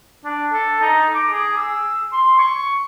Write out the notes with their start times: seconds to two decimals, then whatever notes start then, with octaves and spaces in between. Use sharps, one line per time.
0.25 D4
0.53 A4
0.81 D#4
1.15 D6
1.31 G#4
1.57 E6
2.13 C6
2.38 C#6